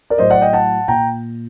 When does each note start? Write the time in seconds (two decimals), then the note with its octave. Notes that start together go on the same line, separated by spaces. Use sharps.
0.10 A#4 D5
0.18 A2 F#3 C5 D#5
0.30 D5 F#5
0.41 D#5 G5
0.53 F#5 A5
0.88 A#2 G5 A#5